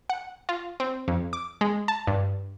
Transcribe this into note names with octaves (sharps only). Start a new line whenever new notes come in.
F#5
F4
C4
F2
D6
G#3
A5
G2